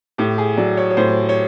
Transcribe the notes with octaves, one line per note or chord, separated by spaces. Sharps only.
A2 G4
G#4
F#3 D5
C#5
C#5
A2 C5
C#5